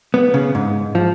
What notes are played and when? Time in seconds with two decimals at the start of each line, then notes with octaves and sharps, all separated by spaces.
0.14 B3
0.34 C#3
0.55 G#2
0.95 F3